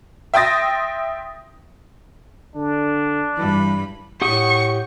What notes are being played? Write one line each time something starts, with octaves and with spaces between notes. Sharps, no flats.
E5 G5 C6 D#6 A6 A#6
D3 D4
G2 E3 B5
A2 G4 F#5 C#6 D#6